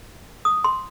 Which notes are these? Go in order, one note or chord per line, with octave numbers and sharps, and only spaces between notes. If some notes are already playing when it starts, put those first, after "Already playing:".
D#6
C6